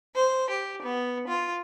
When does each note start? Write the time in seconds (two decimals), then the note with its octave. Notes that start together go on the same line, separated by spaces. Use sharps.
0.15 C5
0.50 G4
0.82 B3
1.27 F4